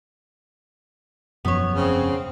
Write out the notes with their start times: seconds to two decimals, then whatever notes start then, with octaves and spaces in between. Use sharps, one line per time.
1.45 E1 F#2 F3 B3 C#5
1.75 C#3 C4